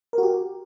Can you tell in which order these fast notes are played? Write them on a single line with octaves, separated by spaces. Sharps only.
A#4 F#4 G4